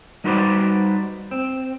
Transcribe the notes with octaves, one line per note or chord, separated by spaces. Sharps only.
G3 D#4 F#4 B4 C5 D5
C4